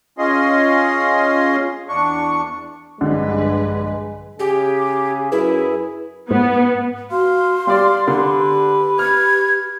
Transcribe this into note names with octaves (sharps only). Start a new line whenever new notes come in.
C#4 F4 G#4 D#5 C6
E2 D4 C#6
A#1 G2 D3 G#3 B4
C#3 G4 G#4
F#2 E4 G#4 B4
G#2 B3
F#4 F5 C6
G3 G4 D5 F5
D3 B4
F6 G#6